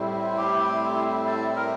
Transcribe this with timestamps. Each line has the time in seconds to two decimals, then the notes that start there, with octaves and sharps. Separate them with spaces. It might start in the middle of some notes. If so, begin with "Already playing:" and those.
Already playing: A2 G3 C4 E4
0.38 G4
1.27 A4
1.56 A#4